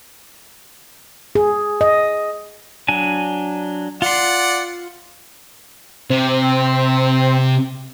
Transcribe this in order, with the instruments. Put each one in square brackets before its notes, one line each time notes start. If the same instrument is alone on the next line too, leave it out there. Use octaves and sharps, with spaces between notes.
[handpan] G#4
D#5
[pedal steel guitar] F#3 D4 G#5
[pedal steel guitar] F4 C6 [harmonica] D5 F#5
[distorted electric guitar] C3 [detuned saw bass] C4